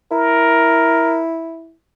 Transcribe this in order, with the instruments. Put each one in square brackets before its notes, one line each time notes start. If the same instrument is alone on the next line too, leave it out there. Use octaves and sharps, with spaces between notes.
[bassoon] E4 [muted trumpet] A#4